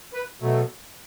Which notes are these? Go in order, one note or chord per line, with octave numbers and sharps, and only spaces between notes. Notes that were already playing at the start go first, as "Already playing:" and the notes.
B4
B2 F#3 A3